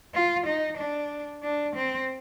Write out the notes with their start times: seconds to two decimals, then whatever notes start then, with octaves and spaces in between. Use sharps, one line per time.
0.14 F4
0.46 D#4
0.78 D4
1.43 D4
1.75 C4